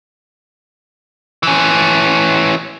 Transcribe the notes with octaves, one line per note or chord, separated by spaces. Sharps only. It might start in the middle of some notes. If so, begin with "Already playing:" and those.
E3 C#4